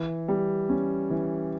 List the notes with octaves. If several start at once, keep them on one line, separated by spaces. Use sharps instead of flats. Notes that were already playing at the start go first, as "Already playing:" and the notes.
Already playing: E3
G3
C#4
E3